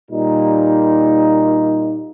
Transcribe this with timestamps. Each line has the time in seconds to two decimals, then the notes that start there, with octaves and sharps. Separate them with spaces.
0.11 A#2 G3 D#4